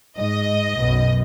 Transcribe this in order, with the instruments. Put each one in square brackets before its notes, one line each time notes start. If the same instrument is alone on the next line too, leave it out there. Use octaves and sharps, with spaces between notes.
[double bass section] G#2 [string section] D#5
[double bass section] B1 F#2 B2